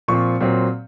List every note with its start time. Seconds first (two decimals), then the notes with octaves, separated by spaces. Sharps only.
0.08 A#2 F3 C4 C#6
0.40 A#2 F#3 C4